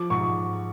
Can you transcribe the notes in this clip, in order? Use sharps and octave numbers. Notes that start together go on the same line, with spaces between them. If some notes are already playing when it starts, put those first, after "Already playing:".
Already playing: F3 D6
G#2 C#6